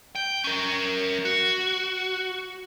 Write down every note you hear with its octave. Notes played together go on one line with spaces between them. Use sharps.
G5
C#4 A#4
F#4